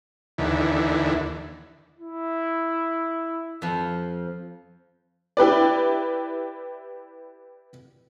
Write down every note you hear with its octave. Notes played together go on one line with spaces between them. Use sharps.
D#2 D3 E3
E4
F2 F3
E4 G4 B4 D5